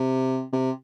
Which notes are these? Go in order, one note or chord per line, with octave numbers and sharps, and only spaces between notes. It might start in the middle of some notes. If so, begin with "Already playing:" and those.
Already playing: C3
C3